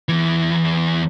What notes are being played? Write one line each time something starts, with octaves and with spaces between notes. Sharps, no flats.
E2 E3